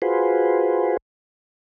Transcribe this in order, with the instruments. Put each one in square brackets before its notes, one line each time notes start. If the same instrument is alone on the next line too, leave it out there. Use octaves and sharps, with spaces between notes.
[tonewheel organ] F4 F#4 G#4 B4 C5